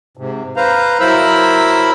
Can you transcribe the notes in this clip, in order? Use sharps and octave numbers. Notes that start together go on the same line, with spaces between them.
G#2 C3
B4 C5 F5 A#5
F#3 E4 A#4 C5 B5 E6